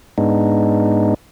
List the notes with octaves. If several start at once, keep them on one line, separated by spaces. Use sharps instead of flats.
G#2 G#3 B3 D4 D#4